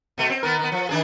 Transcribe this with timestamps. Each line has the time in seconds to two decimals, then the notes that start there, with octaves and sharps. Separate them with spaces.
0.18 B2 A3
0.30 C4
0.43 D#3 B3 A#4
0.59 D#3 B3
0.72 F3
0.89 D#3 D4 G#4